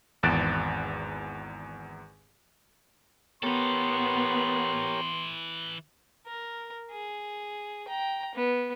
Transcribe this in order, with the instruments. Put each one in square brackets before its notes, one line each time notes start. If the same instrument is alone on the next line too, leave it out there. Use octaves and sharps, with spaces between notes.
[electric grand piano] G#1 E2 F#6 A6 D7 E7
[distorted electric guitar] E3 A4 [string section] B3 [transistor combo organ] G4 A#4 C#5 [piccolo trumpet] C6
[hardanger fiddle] A#4
G#4
G5 A#5
B3